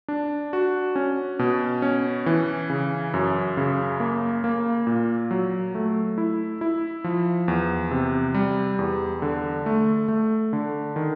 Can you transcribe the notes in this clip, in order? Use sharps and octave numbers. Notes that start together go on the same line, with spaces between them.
D4
F#4
C#4
B2
C#4
E3
C#3
F#2
C#3
A#3
A#3
A#2
F#3
A3
E4
E4
F3
E2
C3
G3
E2
D3
A3
A3
D3
D#3